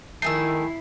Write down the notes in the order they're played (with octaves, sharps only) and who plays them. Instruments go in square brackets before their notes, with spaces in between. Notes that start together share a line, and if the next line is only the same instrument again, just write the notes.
[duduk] D#3 [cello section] F3 E4 [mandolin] A3 G#4 E6 [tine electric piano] C7